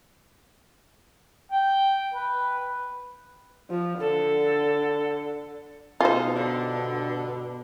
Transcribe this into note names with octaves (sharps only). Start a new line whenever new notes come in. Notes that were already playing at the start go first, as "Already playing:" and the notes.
G5
B4
F3
D3 A4
B2 D#4 F4 C5
G2 D3